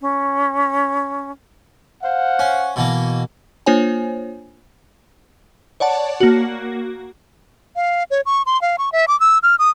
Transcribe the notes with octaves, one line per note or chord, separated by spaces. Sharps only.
C#4
C5 F5 F#5
C#4
B2 E3 A#3
A#3 D4 F4 C5 C#5 G#5
C#5 D5 F#5 A5
A#3 F#4
F5
C#5
C#6
C6
F5
C#6
E5
D6
E6
F6
D#6